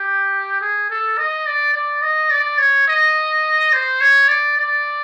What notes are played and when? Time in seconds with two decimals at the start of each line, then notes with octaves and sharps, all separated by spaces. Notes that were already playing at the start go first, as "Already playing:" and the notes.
Already playing: G4
0.61 G#4
0.90 A4
1.18 D#5
1.47 D5
1.74 D5
2.02 D#5
2.30 D5
2.59 C#5
2.88 D#5
3.73 C5
4.01 C#5
4.28 D5
4.58 D5